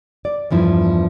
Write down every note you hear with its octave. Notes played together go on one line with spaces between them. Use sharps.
D5
E2 G2 F3 E4